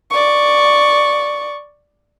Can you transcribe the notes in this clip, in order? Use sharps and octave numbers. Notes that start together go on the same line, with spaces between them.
D5 C#6